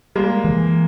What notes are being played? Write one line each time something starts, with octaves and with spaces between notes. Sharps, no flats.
G3 G#3 A#3
E3